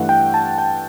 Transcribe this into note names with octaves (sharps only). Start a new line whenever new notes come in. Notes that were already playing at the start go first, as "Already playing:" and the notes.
Already playing: G2 E3 A3 F#5
G5
A5
G5